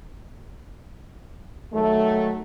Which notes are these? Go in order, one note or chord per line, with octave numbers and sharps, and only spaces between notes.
D#3 F#3 A3